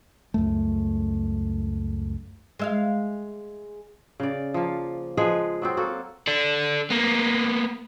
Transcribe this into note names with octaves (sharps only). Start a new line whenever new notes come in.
C#2 F#2 A3
G#3 E5 F5
C#3 D5
F3 A#3
F3 G#3 G#4 B4
F#3 B3 C4
A#3 F#4 A4
A4 D5
A#3 B3